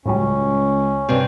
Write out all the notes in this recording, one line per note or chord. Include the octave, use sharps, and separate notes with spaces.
C#2 A2 F#3 G3 C#4
G2 C3